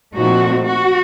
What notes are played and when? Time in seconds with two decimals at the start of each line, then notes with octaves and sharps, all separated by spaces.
0.15 A#2 F3 A3 C4 D#4 F#4
0.66 F#4